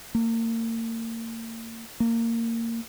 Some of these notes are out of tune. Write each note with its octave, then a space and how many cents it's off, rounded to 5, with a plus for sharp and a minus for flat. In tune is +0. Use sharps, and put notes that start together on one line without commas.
A#3 -35
A#3 -20